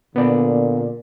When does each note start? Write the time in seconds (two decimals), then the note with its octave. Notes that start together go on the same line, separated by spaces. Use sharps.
0.16 A#2 D3 B3 D5